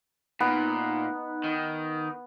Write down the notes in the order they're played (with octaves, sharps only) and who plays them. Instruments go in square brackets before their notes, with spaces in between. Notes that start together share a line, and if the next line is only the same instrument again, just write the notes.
[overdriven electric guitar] A#2 [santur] B3 [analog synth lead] D#4
[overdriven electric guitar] D#3